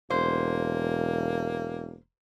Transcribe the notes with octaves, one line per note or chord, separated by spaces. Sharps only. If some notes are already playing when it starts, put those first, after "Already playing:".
E1 A#3 C5